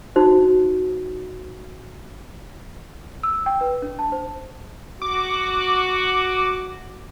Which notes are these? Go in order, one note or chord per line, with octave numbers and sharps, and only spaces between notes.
D#4 F#4 C5
E6
G5
B4
D4
A5
C5
F#4 D6